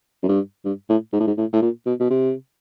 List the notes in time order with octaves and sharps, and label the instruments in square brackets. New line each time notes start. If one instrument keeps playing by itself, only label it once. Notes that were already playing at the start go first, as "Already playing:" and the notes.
[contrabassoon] F#2
G2
G2
A2
G#2
A2
G#2
A2
A2
A#2
B2
B2
C3